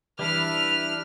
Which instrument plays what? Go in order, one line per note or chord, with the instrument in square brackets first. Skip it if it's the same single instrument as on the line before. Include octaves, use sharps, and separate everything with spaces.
[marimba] E3 [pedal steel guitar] G3 D4 E4 [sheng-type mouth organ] B4 [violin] F6 F7